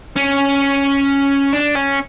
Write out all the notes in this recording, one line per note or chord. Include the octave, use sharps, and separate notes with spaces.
C#4
D4
C#4